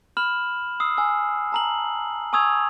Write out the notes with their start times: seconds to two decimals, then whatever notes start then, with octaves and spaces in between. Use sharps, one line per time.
0.17 B5 F6 E7 F#7
0.80 D#6 E6 C7
0.97 G#5 E6
1.52 A5 A#5 F#7
2.33 G#5 C#6 D#6 E6 G#6 F7